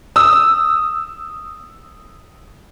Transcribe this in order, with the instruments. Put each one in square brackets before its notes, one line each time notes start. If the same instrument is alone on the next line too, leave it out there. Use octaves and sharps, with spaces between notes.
[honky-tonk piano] D#6 E6